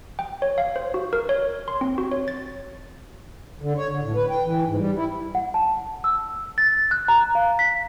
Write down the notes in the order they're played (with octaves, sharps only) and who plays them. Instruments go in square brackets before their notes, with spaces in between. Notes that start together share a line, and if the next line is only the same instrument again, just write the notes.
[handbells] G5
C#5
F5
C5
F#4
A#4
C#5
C6
C4
F#4
C#5
A6
[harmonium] D3
C#5
D3
A2
B4
G5
E3
G#2
G3
E4
[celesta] F#5
A5
E6
A6
F#6
A#5
F5
B6